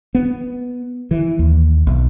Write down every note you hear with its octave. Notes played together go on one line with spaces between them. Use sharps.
B3
E3
D#2
B1